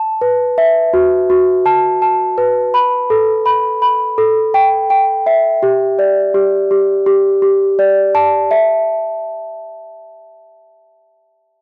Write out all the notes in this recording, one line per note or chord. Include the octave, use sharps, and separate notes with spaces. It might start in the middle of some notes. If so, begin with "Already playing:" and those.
Already playing: A5
B4
E5
F#4
F#4
A5
A5
B4
B5
A4
B5
B5
A4
G5
G5
E5
G4
D5
G4
G4
G4
G4
D5
A5
E5